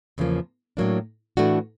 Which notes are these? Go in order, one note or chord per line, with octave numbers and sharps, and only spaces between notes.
E2 C#3 F3 A#3
A2 F#3 A#3 D4
A2 E3 A3 D4 F#4